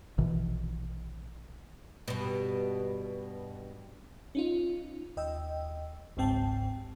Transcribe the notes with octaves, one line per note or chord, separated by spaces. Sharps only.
A#1 B2 D#3 E3
G2 B2
C#4 D#4 F4
D#2 D#5 G5 E6
G1 C#2 G#2 C4 G5 A5